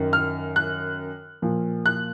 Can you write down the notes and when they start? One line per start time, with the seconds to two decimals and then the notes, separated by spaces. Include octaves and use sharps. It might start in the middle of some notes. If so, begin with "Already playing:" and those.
Already playing: F#2 D#3
0.13 F6
0.56 F#6
1.42 A#2 F3
1.86 F#6